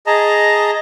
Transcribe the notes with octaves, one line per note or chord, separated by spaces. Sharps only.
G#4 D#5 A5 A#5